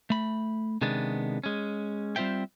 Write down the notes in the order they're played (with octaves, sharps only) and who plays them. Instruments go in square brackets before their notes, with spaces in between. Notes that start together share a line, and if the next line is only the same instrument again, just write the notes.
[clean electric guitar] A3 B5
C3 D#3 G#3 B3 D4
G#3 C#4
G3 C4 F4 C5 E5 G5